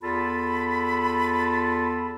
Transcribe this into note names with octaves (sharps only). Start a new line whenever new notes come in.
E2 F4 A4 A5 B5